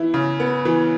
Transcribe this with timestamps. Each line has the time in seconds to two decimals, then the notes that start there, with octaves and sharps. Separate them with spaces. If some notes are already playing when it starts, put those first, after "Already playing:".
Already playing: E3 E4
0.14 C#3
0.40 B3
0.65 E3